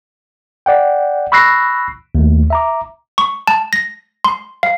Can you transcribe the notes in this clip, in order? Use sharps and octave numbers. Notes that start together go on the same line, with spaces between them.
D5 F#5 G5
B5 C#6 E6 F#6 A#6 C7
D#2 A3
E5 A#5 D6
C#6
A5
A#6
C6
F5